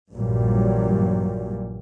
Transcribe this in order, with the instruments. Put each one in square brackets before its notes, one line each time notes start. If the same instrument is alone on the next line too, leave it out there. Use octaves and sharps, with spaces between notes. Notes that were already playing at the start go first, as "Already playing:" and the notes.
[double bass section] A#1 G2 A#2 E3 F#3 G3